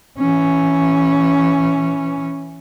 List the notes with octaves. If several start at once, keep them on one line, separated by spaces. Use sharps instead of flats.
E3 C#4